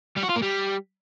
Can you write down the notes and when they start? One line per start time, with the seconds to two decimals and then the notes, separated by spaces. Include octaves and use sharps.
0.17 G3
0.24 F#4
0.30 F4
0.36 A#3
0.42 G3